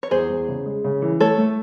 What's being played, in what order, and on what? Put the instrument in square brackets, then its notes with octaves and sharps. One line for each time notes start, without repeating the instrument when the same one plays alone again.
[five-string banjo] C#5
[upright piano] E2 [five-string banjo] G#4 C5
[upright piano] E2
C#3
G#3
C#3
E3
[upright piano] A3 [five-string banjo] A4 C#5
[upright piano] A3